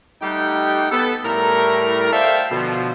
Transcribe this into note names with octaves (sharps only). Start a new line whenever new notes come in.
G3 A3 D#4 G4 F#5 G5
B3 A4
A2 G3 A3 A#4
A4 C5 D5 E5 F5 G5
B2 D3 F3